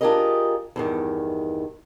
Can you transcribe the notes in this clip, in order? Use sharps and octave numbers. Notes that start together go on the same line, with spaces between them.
D4 F4 G4 G#4 A#4 D#5
E2 G2 D#3